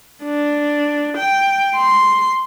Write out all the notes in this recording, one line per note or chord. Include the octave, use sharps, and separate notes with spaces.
D4
G5
C6